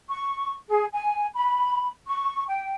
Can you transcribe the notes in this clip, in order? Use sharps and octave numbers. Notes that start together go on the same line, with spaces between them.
C#6
G#4
G#5
B5
C#6
G5